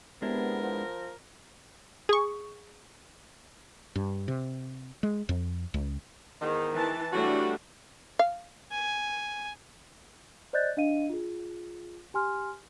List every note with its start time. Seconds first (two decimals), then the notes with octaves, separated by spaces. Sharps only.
0.22 C3 G#3 B3 D4 E4 A#4
0.63 F3
2.09 G#4 C#6
3.96 G2
4.28 C3
5.03 G#3
5.29 F2
5.74 C#2
6.41 E2 G#2 D#3
6.73 E3 A5
7.12 E3 F#3 G3 A3 D4 F#4
8.19 F5
8.72 G#5
10.53 C5 D5 D#5 F#6 G6 A6
10.77 D4 D#5 F5 D#7
11.09 F4 G#4
12.14 G4 G#5 C6 F6